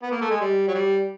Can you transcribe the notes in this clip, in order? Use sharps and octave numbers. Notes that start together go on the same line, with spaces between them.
B3
A#3
A3
G#3
G3
F#3
G3